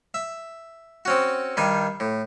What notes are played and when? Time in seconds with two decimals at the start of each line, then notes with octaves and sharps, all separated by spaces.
0.14 E5
1.05 C4 C#4 F#4
1.57 G2 D#3 G3 G#5
2.00 A2